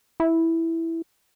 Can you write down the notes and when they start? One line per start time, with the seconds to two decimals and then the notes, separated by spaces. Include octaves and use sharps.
0.20 E4